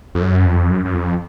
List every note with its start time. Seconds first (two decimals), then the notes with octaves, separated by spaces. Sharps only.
0.15 F2
0.22 F#2
0.46 F2
0.70 F#2
0.85 F#2
0.94 F2